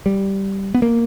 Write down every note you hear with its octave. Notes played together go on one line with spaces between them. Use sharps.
G3
B3
A#3